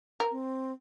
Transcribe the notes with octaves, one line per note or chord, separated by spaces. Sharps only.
A#4
C4